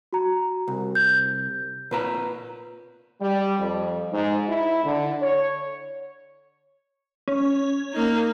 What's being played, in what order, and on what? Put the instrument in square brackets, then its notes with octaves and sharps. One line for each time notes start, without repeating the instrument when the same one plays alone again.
[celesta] F#4 A#5
[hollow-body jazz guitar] C2
[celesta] G6
[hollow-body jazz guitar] A#2 B4 A#5
[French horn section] G3
F2
G#2
E4
D3
C#5
[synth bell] C#4
[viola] A#3 D#4